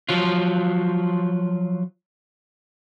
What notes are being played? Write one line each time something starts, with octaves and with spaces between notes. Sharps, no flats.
F3 F#3 F4